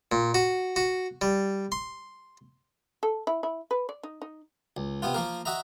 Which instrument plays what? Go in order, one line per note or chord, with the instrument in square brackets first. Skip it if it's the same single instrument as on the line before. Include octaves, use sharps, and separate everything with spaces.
[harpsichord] A#2
F#4
F#4
G3
C6
[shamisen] A4
E4
E4
B4
D5
D#4
D#4
[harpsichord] C#2
C3 B3 F4
F3 A#3 A#4
F#4 D#5 E5 A#5